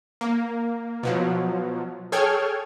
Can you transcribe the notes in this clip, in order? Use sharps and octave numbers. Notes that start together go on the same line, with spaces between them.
A#3
B2 F3 F#3
G#4 A4 C#5 G5 F6 G#6